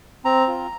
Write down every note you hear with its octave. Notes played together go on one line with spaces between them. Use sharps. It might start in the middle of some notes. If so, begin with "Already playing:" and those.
C4 A#5
F4